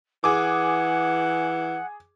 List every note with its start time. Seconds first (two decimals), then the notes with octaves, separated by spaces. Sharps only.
0.24 E3 G#4 F#5 D6